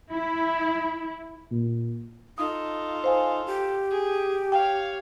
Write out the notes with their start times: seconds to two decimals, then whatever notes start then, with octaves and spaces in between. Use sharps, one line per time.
0.11 E4
1.51 A#2
2.38 D#4 F4 A4 D#6
3.04 C5 F5 G#5
3.46 G4
3.91 G#4
4.52 C#5 F5 G5